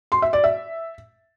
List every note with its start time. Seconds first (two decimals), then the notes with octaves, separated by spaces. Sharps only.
0.12 C6
0.22 E5
0.33 D5
0.44 E5